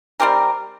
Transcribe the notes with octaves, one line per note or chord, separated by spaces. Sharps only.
G3 C4 G4 A#4